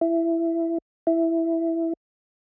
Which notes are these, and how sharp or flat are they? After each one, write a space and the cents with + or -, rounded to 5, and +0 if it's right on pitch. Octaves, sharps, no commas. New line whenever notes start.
E4 +15
E4 +5